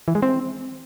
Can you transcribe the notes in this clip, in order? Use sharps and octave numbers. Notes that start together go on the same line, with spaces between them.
E3
G#3
C4